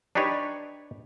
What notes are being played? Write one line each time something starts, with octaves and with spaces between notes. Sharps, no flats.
D4 D#4 G4 B4 C#5